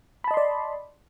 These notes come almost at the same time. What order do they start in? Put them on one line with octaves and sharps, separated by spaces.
B5 A5 D#5 C6 D5